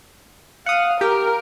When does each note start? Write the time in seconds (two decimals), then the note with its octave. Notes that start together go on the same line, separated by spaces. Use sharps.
0.66 F5 F#5 D#6
1.01 G4 A#4